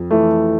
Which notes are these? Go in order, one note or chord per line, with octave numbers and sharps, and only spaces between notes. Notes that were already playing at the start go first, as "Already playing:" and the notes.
Already playing: F2
E3 A3